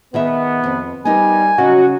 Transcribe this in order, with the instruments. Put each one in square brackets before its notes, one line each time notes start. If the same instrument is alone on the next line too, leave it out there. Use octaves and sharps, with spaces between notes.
[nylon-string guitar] D#3 G#4 E5 [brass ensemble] B3
[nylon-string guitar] F2 C4
[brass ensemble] G3 [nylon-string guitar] B3 D#4 A#4 [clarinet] G#5
[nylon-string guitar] C#3 C#4 [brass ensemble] F#3 D#5 [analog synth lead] F#4